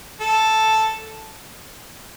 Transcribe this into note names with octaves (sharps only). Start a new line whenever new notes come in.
A4